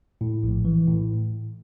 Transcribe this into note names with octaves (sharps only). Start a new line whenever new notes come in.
A2
A#1
E3
A2